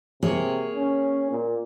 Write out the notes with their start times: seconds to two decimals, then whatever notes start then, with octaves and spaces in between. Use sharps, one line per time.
0.23 C3 A#3 G#4 C#5
0.76 C#4
1.31 A#2